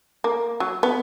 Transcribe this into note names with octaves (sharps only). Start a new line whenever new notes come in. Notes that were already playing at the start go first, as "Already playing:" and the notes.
A#3
F#3
B3